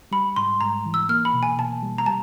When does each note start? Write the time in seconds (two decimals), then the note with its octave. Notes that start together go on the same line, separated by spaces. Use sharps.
0.11 G3 B5
0.36 G#2 C6
0.61 G#2 A#5
0.86 E3
0.94 E6
1.09 A#3 F6
1.25 B5
1.34 B2
1.43 G#5
1.58 B2 A5
1.82 G3
1.98 A#5
2.06 G3 A5